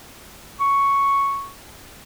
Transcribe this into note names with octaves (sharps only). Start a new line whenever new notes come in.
C#6